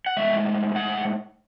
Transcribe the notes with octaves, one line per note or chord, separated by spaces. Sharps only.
F#5
A2 G#3 E5
F#5